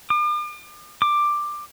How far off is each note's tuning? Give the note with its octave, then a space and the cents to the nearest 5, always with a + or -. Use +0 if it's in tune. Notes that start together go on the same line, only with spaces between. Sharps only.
D6 +45
D6 +10